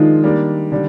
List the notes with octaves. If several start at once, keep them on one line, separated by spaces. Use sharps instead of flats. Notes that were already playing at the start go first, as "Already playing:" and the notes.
Already playing: D#3 F3 G#3 D4 D#4 F4
G3 A#3 D4
D3 G3